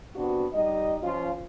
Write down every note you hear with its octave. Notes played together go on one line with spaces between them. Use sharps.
C3 B3 D4 F#4
G3 D#4 D#5
F3 C#4 F4